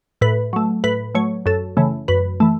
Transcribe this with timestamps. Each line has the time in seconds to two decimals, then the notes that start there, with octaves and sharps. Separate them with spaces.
0.21 A2 B4
0.53 F#3 A3
0.84 A2 B4
1.15 F#3 A3 C#5
1.46 F#2 A4
1.77 C#3 E3 A3
2.08 F#2 B4
2.40 E3 A3